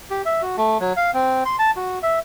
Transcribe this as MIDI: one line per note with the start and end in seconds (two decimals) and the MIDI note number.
0.10 0.22 67
0.25 0.42 76
0.42 0.56 66
0.57 0.78 57
0.80 0.93 54
0.97 1.11 77
1.14 1.44 60
1.45 1.56 84
1.59 1.71 81
1.76 1.99 66
2.03 2.19 76